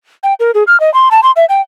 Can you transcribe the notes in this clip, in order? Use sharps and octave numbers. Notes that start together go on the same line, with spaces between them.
G5
A#4
G#4
F6
D#5
C6
A5
C6
E5
G5